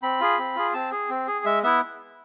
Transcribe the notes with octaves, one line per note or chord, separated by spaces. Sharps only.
C4 B5
F4 G#4
C4
F4 G#4
C4 A5
G#4
C4
G#4
G#3 E5
B3 E4 E5